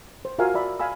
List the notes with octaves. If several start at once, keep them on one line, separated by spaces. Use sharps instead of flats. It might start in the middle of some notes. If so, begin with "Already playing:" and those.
C5
F4 F#4 A#4 E5 F5 G#5
D5 E5 B5
D#5 F5 G#5 B5 E6